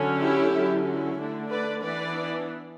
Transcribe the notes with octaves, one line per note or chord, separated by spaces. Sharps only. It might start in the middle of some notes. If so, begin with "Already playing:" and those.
Already playing: D3 F#3 C#4
E4 G4
D3 F#3 C#4
E4
D3 A3 D4
B4 D5
E3 B3 D4 B4 D5